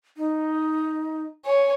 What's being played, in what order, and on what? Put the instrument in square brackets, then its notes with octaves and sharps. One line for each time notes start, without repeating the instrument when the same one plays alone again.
[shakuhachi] D#4
[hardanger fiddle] C#5 [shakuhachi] G#5